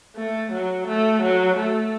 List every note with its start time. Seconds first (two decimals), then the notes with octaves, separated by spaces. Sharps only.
0.17 A3
0.53 F#3
0.88 A3
1.23 F#3
1.57 A3